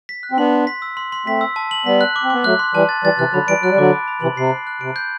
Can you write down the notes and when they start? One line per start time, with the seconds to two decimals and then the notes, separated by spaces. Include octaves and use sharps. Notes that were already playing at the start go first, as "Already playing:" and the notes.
0.09 B6
0.23 F#6
0.32 C4
0.38 B3 D4 C6
0.53 C6
0.67 B6
0.82 E6
0.97 C6
1.12 C6
1.26 A3 C4 B6
1.41 E6
1.56 A5
1.71 F#7
1.86 G3 B3 B6
2.01 F#6
2.16 D6
2.23 C4
2.30 B3 D6
2.44 F#3 A3 F#6
2.59 C6
2.74 E3 G3 A5
2.89 A6
3.04 E3 G3 A6
3.19 C3 E3 F#6
3.33 D3 F#3 B5
3.48 E3 G3 D7
3.63 F#3 F#6
3.71 G3
3.77 D3 F#3 D6
3.93 B5
4.08 B5
4.22 C3 E3 F#7
4.37 C3 C7
4.51 F#6
4.67 F#6
4.81 C3 D7
4.96 G6